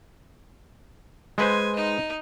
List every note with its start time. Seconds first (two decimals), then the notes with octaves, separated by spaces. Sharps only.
1.38 G#3 B4 C5 G#5
1.76 D#4 D#5